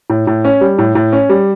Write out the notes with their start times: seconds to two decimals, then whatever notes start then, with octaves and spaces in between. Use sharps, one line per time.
0.10 A2
0.27 A2
0.45 C#4
0.61 G3
0.79 A2
0.95 A2
1.13 C#4
1.30 G3